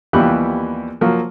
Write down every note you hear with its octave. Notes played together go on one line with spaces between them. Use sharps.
D#2 E3 F3 G3 B3 F#6
F3 F#3 A#3